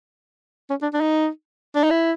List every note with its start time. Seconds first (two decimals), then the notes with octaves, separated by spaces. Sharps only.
0.70 C#4
0.82 D4
0.94 D4
1.01 D#4
1.76 D4
1.84 D#4
1.91 E4